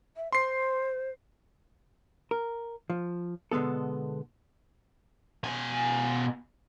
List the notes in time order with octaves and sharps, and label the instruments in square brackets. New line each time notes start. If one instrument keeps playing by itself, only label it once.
[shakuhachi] E5
[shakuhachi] C5 [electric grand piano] C6 C7
[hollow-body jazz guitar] A#4
F3
B2 D3 G#3 B3 A4
[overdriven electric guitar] B2 G#5